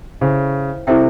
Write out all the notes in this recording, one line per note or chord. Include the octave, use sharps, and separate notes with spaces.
C#3 E4 A4 C5 E5 G5
C3 E4 A4 C5 E5 G5